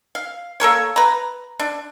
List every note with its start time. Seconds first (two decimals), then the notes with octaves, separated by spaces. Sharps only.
0.15 F5
0.60 A#3 A4 A#4 C#5
0.96 B4 A#5
1.59 D4